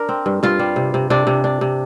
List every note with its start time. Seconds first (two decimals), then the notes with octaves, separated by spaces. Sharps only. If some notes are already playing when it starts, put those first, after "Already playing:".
Already playing: D4 A#4
0.09 C4
0.26 G2
0.43 G2 F4
0.59 G3
0.76 C3
0.94 C3
1.10 C3 D4
1.27 C3
1.44 D4
1.61 C3